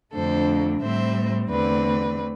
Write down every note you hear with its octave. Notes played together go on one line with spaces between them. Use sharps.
F2 D3 A3 D4 A4 C5
A2 G3 C4 C5 E5
E2 D3 A3 C4 B4 D5